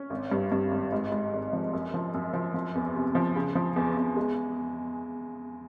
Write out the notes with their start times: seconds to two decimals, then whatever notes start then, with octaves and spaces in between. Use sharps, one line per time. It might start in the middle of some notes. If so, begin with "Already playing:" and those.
Already playing: C#4
0.10 G#1
0.32 G2
0.52 G2
0.71 G#1
0.93 G#2
1.12 G#2
1.33 G#1
1.53 F3
1.73 F#2
1.94 F3
2.14 F#2
2.33 F3
2.54 F3
2.75 E2
2.95 C3
3.15 F3
3.36 C#3
3.55 F3
3.76 E2
3.97 E2
4.16 G#3